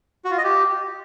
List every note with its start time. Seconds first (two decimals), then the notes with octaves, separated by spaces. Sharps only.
0.25 F#4
0.31 F4
0.38 D#5
0.44 G4